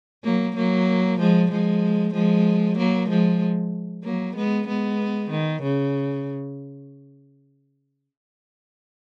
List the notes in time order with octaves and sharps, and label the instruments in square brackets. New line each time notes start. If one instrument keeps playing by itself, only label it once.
[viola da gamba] F#3 A#3
F#3 A#3
F3 G#3
F3 G#3
F3 G#3
F#3 A#3
F3 G#3
F#3 A#3
G#3 B3
G#3 B3
D#3
C#3